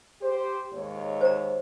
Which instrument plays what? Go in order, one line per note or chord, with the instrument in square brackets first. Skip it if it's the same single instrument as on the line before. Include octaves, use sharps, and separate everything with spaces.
[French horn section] G4 C5
D#2 G#2 C#5
[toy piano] C5 A#5